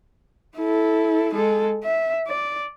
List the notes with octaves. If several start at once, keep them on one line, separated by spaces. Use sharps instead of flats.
E4 A4
G#3 A4
E5
D5